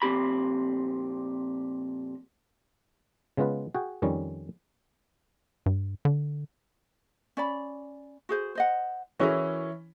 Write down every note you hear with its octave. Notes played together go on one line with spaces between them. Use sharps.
F2 A#2 C4 G4 B5
C#3 G#3 B3 F4 B4
F#4 G#4 G5
F2 D#3 G3 C#4
G2
D3
C#4 D5 B5
F#4 G#4 C5
C5 D#5 F#5
E3 C#4 E4 F#4 G#4 A#4